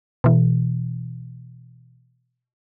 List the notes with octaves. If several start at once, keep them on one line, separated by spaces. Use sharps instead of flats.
B2 E3